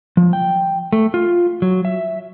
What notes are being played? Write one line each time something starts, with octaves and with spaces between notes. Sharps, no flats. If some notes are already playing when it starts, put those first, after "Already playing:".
F3
G5
A3
F4
F#3
E5